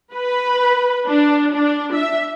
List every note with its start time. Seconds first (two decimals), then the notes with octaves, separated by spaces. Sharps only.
0.12 B4
1.07 D4
1.53 D4
1.94 E5